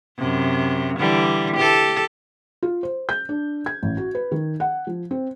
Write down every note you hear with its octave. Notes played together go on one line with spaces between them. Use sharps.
F#2 C3
D3 E3 G3
G4 A4
F4
C5
G6
D4
G#6
A1
F#4
B4
D#3
F#5
F3
C4